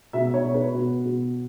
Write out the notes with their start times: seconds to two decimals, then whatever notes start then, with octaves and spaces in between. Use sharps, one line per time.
0.13 B2 E5
0.34 C#5
0.44 B2
0.54 B4
0.75 B2
1.05 B2